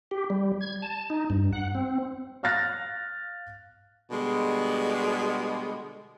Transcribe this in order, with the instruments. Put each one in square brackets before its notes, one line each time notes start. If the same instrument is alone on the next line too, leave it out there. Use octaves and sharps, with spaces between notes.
[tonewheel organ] G4
G3
G#6
A5
D#4
G2
F#5
C4
[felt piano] F5 F6 F#6 A6 A#6
[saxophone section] B2 D3 G3 G#3